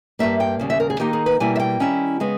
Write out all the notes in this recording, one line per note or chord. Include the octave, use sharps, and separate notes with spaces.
G2 G3 A#3 E5
G5
D#2 C#3 G3
E5
A#4
G#4
D#3 A#3 D#4 G4
G#4
B4
B2 G3 A#3 E4 G#5
E5
G5
D#3 G3 C#4 E4
C#3 G#3 B3